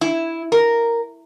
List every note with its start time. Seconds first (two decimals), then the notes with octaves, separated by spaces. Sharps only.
0.01 E4
0.52 A#4